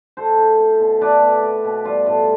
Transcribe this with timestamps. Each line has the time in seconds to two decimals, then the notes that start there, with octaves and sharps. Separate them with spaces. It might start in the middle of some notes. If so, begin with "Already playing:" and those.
0.17 A3 A4 C5
0.38 E4
0.59 C4
0.80 B2
1.01 A3 B4 D5
1.21 B2
1.43 C4
1.64 B2
1.85 G3 F4
2.06 A2